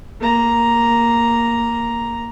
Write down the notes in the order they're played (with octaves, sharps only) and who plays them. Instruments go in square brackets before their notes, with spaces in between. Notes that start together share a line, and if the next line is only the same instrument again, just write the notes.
[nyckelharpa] A#3 A#5